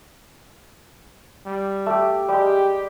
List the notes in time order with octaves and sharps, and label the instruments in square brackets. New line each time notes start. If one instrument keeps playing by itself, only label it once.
[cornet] G3
[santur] A3 G4
[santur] G3 G#3 [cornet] G4